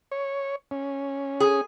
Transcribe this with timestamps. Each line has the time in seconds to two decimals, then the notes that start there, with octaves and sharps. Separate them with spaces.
0.12 C#5
0.71 C#4
1.40 G#4